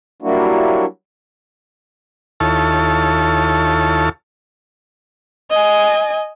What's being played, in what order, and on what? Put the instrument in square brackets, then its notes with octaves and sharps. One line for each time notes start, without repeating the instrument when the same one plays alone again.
[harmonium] F#3 G3 A#3 D4 E4 F#4
[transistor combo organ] D#2 E4 F4 A4 C#5 A5
[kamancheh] D#5 G#5